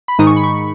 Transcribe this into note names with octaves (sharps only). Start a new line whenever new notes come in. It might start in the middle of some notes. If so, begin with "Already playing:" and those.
B5
G#2 D#3 G#3 D#4 D#6
C#6
B5
C#6